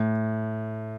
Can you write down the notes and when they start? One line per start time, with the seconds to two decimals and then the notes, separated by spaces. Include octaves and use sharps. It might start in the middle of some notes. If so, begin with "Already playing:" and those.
Already playing: A2